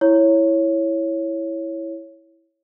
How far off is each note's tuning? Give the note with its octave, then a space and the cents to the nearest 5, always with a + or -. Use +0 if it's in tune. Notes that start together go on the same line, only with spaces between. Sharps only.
E4 +0 C#5 -5